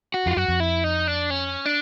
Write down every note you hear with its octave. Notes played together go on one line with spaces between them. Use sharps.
F#4
F2 F4
F#2 F#4
F2
E4
D#4
D4
C#4
D4